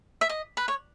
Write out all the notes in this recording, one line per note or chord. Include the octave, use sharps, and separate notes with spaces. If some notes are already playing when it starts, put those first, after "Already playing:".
E5
D#5
B4
C#5